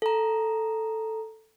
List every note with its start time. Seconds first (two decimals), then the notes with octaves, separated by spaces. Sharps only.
0.02 A4 A#5